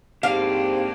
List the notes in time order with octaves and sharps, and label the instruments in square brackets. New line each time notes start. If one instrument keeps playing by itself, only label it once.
[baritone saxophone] G#2 [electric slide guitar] A#3 D4 [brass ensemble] C4 G4 [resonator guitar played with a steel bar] F5